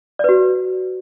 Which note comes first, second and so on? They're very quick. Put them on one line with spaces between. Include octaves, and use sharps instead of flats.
D5 B4 F#4